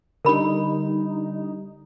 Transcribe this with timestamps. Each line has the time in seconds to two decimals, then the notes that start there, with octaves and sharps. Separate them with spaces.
0.25 D3 G3 D#4 A#4 B5